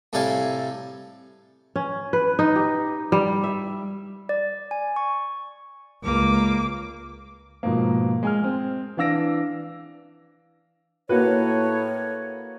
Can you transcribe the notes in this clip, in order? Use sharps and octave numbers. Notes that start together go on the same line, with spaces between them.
A2 C3 G3 A4 F5 G#5
C#4
B4
D#4
G4
G3
E5
D5
G#5
C#6
C#2 A#3 D6
G#2 B2 F3 A#3
G#3 G#5 F6
G#3 C4
E3 D4 F5 E6 A#6 D7
A2 A#3 F#4 B4 C#5